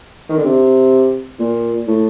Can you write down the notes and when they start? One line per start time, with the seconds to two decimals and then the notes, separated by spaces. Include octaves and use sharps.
0.29 D#3
0.37 D3
0.45 C3
1.39 A#2
1.87 A2